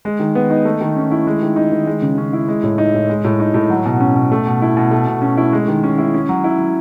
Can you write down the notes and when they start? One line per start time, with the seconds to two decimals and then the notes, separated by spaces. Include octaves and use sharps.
0.05 G#3
0.20 D#3
0.35 B3
0.50 D#4
0.65 A3
0.81 D#3
0.96 C#4
1.11 E4
1.27 G#3
1.42 D#3
1.56 D#4
1.72 D#3
1.87 G#3
2.02 C#3
2.18 C#4
2.33 E4
2.48 G#3
2.64 A2
2.78 D#4
2.94 A2
3.09 G#3
3.25 A2
3.40 D#4
3.54 A2
3.70 F#3
3.85 B2
4.00 C#4
4.15 B2
4.32 A3
4.47 B2
4.62 E4
4.77 B2
4.91 A3
5.07 B2
5.22 C#4
5.37 E4
5.53 G#3
5.68 D#3
5.84 C#4
5.98 E4
6.14 C#4
6.29 F#3
6.44 E4
6.59 F#3